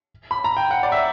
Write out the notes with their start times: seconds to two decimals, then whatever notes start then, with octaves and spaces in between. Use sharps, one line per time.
0.31 B5
0.44 A#5
0.57 G5
0.71 F#5
0.83 D5
0.92 E5